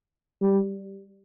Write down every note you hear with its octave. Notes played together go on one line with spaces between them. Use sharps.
G3